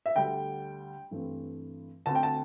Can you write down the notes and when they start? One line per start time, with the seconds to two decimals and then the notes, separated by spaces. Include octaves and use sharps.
0.06 E5
0.16 D2 D3 G3 G5
1.11 G2 E3 A3 C4
2.06 D2 D3 C4 A5
2.15 G5
2.23 A5